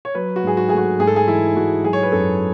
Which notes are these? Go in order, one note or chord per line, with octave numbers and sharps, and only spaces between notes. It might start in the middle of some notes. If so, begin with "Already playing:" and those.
C#5
F#3 B4
F#4
G#2 G#4
F#4
A3 G#4
F#4
G#2 G#4
A4
G#4
E3 E4
G#2 F#4
F#3 G#4
C#5
B4
F#2 A4